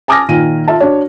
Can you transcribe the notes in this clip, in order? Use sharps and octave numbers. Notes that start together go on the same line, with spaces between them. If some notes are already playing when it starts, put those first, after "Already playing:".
G#5 A5 D6 D#6 F6 A#6
A#2 D#3 G#5 D#7
F4 E5 A5
D4 F#4 C#5